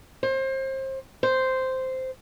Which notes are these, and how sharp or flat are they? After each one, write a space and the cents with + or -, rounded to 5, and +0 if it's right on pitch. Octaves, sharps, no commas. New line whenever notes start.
C5 +30
C5 -5